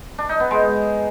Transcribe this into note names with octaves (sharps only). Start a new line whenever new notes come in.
D4
D#4
B3
G#3